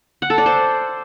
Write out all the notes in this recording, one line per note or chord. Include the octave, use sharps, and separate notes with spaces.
F#5
A4
D5
C5